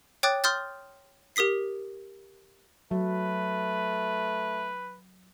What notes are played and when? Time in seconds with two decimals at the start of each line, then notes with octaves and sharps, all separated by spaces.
0.23 C#5 G5 D6 D#6 F#6 A6
0.44 C6 D#6 F6 G6 A6
1.36 G4 A#4 D#6 B6 C7
2.91 F#3 A3 B4